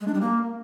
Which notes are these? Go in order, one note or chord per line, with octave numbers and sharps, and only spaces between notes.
G#3
D4
G3
A#3